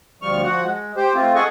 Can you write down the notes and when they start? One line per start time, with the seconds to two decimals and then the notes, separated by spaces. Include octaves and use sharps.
0.22 D2 F3 G3 C#6 F6
0.44 F3 F#4 F#5
0.64 G#3
0.97 G4 C5
1.15 A3 C4 F4
1.35 G#4 A4 D#5 F#5 G#5 C#6